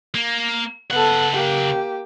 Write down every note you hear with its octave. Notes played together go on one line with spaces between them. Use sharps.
A#3
C#3 B3 A4 F#5
A#3 G4